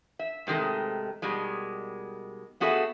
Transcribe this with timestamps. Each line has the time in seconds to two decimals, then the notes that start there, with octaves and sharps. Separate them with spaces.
0.19 E5
0.47 G#2 C3 D#3 G#3 A3
1.22 B2 D#3 G3 G#3
2.60 A3 B3 F#4 G#4 A4 E5